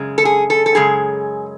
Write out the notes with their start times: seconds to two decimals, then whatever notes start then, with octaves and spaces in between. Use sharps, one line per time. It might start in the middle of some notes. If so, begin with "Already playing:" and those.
Already playing: F#2 C#3 G#3
0.18 A4
0.25 G#4
0.50 A4
0.66 A4
0.75 F#2 C#3 G#3 G#4